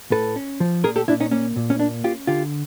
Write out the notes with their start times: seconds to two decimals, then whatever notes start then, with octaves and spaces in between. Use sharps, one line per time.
0.11 A2 A4 B4
0.36 C#4
0.60 F3
0.84 A#2 G#4 A#4
0.96 G4 A4
1.08 A#2 D4 E4
1.20 C#4 D#4
1.31 A#3 C#4
1.56 A#2
1.70 C#4
1.79 A#3 D4
2.04 C#4 F4 G4
2.27 D3 F4 G4